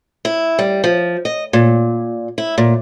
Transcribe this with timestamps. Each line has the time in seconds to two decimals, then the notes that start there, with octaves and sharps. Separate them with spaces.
0.25 E4
0.59 G3
0.84 F3
1.25 D#5
1.53 A#2
2.38 E4
2.58 A#2